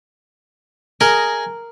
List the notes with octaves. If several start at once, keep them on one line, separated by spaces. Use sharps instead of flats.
G#4 A#4 D#5